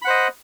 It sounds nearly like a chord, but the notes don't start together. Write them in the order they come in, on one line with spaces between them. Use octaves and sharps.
B5 F#5 C5 D#5